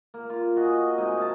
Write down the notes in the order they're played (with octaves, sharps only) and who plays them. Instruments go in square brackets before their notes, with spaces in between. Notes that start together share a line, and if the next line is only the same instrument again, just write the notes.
[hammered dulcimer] A#3
F4
F#4 G#4 D#5
D#5
C3 G#3 D#4
G#4 A#4 A5